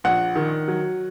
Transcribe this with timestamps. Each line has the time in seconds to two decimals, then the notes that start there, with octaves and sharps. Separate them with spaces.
0.04 A#1 F#5
0.35 D#3
0.68 F#3